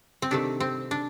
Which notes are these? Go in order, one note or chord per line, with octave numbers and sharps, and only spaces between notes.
C4
C3 D#3 A3 D4
C4
D4